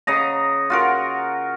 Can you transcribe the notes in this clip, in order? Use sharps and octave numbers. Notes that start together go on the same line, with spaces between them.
C#3 D#5 A#5
F4 F#4 A#4